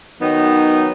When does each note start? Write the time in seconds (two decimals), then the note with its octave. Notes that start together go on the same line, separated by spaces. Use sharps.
0.21 D#3 F#3 B3 D#4